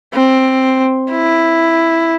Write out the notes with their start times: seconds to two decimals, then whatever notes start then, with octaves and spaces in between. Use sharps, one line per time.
0.14 C4
1.10 E4